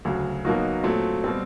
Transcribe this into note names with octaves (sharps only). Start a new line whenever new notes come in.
D2 C#3 F#3
B2 F#3 A#3 D#4 F#4
A#2 F#3 A3 C4
B2 G3 C4